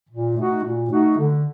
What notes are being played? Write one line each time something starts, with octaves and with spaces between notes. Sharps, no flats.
A#2
A3 D#4 F#4
A#2
A3 D#4 F#4
D3